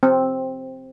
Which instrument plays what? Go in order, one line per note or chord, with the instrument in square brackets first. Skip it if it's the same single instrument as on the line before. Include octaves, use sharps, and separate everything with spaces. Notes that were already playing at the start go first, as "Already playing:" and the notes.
[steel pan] C4